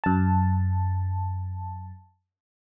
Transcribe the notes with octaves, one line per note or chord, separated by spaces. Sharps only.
F#2 A5